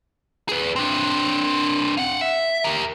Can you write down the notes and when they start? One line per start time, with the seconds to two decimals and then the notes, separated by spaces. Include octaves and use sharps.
0.49 G#4 B4
0.76 C4 D4
1.97 F5 F#5
2.21 E5
2.64 G4 A#4